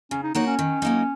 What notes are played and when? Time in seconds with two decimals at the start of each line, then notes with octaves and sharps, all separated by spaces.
0.11 C#3 C#4
0.23 D#4
0.35 A#3 D#4 F#4 C#5
0.47 C#4
0.59 D#3
0.82 F#3 A#3 D#4